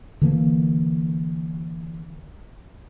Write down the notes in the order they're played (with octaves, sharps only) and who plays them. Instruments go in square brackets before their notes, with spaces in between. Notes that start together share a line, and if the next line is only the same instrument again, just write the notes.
[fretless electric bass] D3 E3 A#3